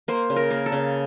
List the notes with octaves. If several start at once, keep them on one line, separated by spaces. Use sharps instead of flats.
A#3 C5
C#3
A#4
A#3
A4
C#3